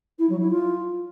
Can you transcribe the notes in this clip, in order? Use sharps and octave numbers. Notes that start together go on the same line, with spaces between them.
E4
F#3
E4
F4